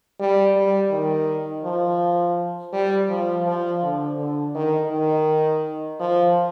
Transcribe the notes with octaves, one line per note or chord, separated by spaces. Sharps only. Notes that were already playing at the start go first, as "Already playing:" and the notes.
G3
G3
D#3
F3
G3
F3
F3
D3
D3
D#3
D#3
F3